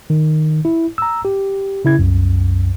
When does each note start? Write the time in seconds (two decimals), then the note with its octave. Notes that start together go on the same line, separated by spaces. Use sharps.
0.10 D#3
0.65 E4
0.98 A#5 E6
1.25 G4
1.85 C#3 E4 G#6
1.99 C2 F#2